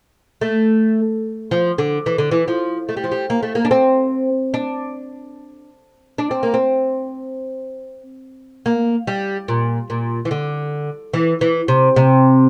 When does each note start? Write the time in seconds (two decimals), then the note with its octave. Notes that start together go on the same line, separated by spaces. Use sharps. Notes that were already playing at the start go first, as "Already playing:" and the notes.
0.41 A3
1.51 F3
1.78 D3
2.06 E3
2.18 D3
2.31 E3
2.48 F3
2.89 A3
2.97 G3
3.04 F3
3.12 G3
3.30 A#3
3.43 A3
3.55 A#3
3.65 D4
3.71 C4
4.54 D4
6.18 D4
6.31 C4
6.43 A#3
6.54 C4
8.66 A#3
9.07 G3
9.48 A#2
9.90 A#2
10.25 E3
10.31 D3
11.14 E3
11.41 E3
11.68 C3
11.96 C3